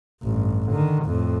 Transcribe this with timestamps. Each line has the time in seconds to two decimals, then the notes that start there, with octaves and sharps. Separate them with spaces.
0.23 A1 G2
0.70 D3 D#3
1.05 F2 A2